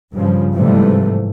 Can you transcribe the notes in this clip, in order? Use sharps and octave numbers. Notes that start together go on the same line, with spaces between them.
G2 C#3 F3
G#2 C3 E3 F3 G3 A3